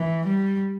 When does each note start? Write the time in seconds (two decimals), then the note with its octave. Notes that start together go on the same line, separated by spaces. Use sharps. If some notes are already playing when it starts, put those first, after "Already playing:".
Already playing: E3
0.25 G3